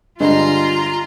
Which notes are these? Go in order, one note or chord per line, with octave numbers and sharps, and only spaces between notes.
G2 D3 G#3 F4 A#5 C6